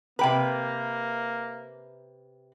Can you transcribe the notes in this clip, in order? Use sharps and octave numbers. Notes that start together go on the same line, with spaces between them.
C3 A#3 B4 G5 A#5